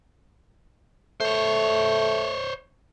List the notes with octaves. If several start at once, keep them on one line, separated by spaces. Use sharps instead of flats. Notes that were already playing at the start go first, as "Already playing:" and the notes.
A3 C5 C#5